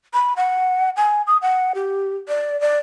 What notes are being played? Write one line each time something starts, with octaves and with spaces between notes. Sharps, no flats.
B5
F#5
G#5
D#6
F#5
G4
D5
D5